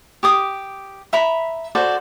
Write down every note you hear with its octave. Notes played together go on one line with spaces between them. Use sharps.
G4 D6 D#6
E5 A#5 B5
F#4 A4 C5 D5